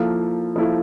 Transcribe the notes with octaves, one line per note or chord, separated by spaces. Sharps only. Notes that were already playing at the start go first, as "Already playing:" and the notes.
Already playing: F3 A#3 E4 A4
F3 A#3 E4 A4